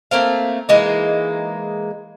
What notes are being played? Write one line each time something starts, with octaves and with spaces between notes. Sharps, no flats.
A3 A#3 C4 F5
E3 G#3 A#3 D#4